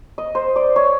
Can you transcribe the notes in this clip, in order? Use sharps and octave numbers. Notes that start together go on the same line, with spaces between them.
D#5
C5
D5
C#5